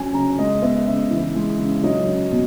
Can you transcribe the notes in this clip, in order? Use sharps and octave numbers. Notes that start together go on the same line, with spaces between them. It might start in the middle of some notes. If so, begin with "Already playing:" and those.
Already playing: F#3 C#4 G#5
C#3 A#5
G#3 D#5
B3 E5
C#3 E5
E3
G#3
C#3
F#3 D#5
C#4
B2